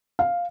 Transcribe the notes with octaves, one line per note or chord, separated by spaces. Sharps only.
F5